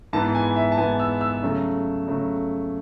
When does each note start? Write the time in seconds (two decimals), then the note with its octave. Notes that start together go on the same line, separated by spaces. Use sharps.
0.13 G#2 E3 B3 A5
0.35 G#5
0.56 E5
0.72 A5
0.78 G#2 E3 B3 G#5
1.00 E6
1.21 E6
1.43 C#3 F#3 A3
2.08 C#3 F#3 A3